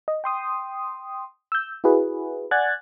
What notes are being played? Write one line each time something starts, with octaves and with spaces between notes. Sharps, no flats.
D#5
G5 C6 D#6
E6 G6
E4 F#4 G#4 B4
D5 F#5 G#5 F#6 G#6 A6